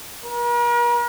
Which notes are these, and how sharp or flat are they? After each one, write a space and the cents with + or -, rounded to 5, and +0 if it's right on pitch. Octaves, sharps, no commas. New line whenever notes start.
A#4 +45